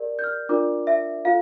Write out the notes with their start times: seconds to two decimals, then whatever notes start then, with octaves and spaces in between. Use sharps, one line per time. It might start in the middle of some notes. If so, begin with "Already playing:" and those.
Already playing: G4 A#4 D5
0.19 G6
0.24 F6
0.49 D4 F4 A#4 D5 D6
0.87 E5
1.25 F4 A4 F5